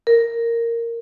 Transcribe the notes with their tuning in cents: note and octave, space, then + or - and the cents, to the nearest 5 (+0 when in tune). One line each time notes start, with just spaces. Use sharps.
A#4 -10